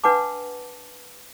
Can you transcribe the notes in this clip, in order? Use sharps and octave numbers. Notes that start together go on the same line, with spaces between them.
D4 B4 F#5 A5 D6